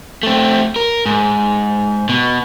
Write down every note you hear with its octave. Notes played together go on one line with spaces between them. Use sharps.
A3 C4
A#4
G#2
B2